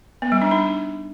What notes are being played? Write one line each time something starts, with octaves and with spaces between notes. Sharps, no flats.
B3
G3
D4
D#4